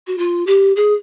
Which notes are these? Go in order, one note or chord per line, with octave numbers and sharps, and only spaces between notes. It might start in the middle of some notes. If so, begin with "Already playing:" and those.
F#4
F4
G4
G#4